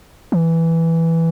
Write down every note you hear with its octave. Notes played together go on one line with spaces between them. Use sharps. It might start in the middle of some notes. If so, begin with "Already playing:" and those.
E3